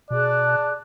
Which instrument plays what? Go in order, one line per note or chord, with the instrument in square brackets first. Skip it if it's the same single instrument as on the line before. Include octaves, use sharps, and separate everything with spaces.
[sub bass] B2 [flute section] G#4 A5 F#6 [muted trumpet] D5